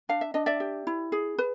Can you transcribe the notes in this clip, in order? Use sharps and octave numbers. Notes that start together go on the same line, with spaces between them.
D4 F5
E5
D4 D#5
D5 E5
G4
E4
G#4
B4